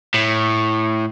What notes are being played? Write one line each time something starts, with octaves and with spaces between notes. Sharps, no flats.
A2